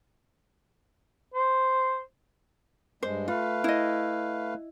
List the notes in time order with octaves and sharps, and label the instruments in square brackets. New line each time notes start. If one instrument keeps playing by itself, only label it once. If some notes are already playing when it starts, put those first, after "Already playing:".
[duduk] C5
[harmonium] G2 G#3 [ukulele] C5
[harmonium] A3 B4 F5 [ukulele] F4
[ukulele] E4 D#5